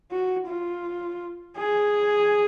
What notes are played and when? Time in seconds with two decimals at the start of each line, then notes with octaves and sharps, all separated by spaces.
0.11 F#4
0.47 F4
1.57 G#4